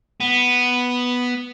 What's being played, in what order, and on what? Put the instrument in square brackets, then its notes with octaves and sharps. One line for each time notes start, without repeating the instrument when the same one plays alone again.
[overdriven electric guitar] B3